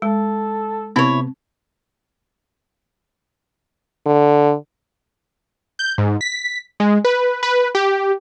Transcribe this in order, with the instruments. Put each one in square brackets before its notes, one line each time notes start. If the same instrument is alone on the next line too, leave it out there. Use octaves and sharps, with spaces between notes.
[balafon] G#3 [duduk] A4
[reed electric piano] C3 B3 [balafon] C4 [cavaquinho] E4 C#5
[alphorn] D3
[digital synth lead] G6
G#2
B6
G#3
B4
B4
G4